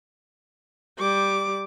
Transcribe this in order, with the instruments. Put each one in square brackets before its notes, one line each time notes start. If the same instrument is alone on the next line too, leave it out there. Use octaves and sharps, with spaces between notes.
[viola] G3 D6